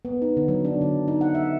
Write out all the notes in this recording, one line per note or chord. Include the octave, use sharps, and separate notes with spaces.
B3
D#4
D3
F#3
D4
D3
D#4
F#5
E5